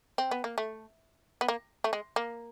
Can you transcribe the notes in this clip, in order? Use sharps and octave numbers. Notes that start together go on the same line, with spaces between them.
C4
B3
A#3
A3
B3
A#3
A3
G#3
A#3